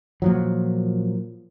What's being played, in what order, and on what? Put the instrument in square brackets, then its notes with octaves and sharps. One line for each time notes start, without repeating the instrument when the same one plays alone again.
[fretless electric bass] A#2 F3 F#3